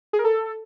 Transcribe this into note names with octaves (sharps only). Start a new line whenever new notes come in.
G#4
A#4
A4